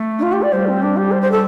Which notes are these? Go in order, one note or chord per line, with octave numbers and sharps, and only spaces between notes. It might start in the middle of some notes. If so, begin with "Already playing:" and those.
Already playing: A3
D4
F4
G4
D5
G3 C5
C4
D4
G4
C5
C5
A4